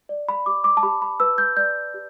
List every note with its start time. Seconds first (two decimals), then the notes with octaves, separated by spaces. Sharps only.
0.09 D5
0.28 B5
0.46 G4 D6
0.64 D6
0.77 A5
0.83 G4 B5
1.02 B5
1.20 B4 E6
1.38 G6
1.57 D5 G6
1.94 G4